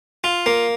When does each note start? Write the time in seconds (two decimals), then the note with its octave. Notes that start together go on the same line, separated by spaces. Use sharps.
0.24 F4
0.46 A#3